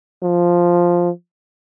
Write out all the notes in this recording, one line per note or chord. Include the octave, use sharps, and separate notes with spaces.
F3